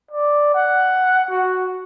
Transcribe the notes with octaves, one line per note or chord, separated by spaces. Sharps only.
D5
F#5
F#4